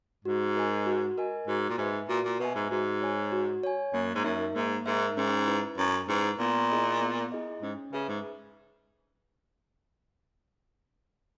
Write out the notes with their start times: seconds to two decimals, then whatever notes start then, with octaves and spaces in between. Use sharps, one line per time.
0.25 G#2 F#4
0.56 A#4 D#5 G#5
0.86 F#4
1.18 A#4 D#5 G#5
1.48 G#2 F#4
1.69 A#2
1.78 G#2 B4 E5 G#5
2.09 A#2 F#4
2.25 A#2
2.40 B2 B4 E5 G#5
2.55 G#2
2.70 G#2 F#4
3.02 C#5 G#5
3.32 F#4
3.63 C#5 G#5
3.94 F#2 A#3
4.15 G#2
4.24 F#2 D#4 A#4 E5
4.55 G#2 A#3
4.86 G#2 D#4 A#4 E5
5.17 G#2 C#4
5.47 E4 B4
5.78 F#2 C#4
6.09 G#2 E4 B4
6.39 A#2 B3
6.71 E4 G#4 D#5
7.01 B3
7.32 E4 G#4 D#5
7.62 G#2 C#4
7.93 C#3 G#4 B4 E5
8.08 G#2